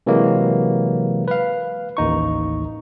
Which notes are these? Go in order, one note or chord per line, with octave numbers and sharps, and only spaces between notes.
C3 E3 F#3 G#3 A#3
B4 F5
A1 D#2 D#4 C#6